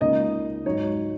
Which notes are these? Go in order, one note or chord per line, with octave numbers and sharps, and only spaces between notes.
C#2 C#3 A#3 D#4 D#5
G#2 F#3 D#4 C#5